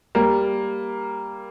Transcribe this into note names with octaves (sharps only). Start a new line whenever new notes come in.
G3 A#3